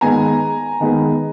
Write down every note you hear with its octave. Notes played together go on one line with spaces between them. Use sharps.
D#3 G#3 B3 G#5 A#5
D#3 G#3 B3